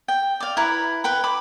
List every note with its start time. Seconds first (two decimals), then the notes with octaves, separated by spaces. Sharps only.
0.08 G5
0.40 D5 F5
0.57 E4 B4 A#5
1.04 B4 G5 B5
1.24 B5 D6